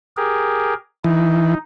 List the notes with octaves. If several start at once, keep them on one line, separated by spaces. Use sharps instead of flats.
G4 G#4 A#4
E3 D#4